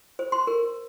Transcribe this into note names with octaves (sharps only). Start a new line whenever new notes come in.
C5
C6
A#4